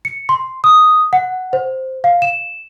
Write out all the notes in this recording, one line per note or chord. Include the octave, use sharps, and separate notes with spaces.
C#7
C6
D#6
F#5
C5
F5
E7